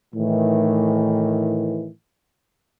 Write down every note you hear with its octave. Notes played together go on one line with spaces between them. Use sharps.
A2 D#3 E3